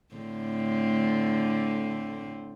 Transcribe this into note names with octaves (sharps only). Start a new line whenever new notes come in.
A2 D3 C4